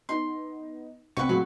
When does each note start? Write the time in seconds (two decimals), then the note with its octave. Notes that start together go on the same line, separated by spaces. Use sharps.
0.09 B3 D#4 C6
1.17 C2 G2 C4 B4 F5 F#5 C#6
1.29 A2 C#3 F#3 G#3